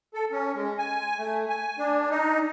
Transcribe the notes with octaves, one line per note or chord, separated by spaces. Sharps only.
A4
C#4
G#3
G#5
A3
G#5
D4
D#4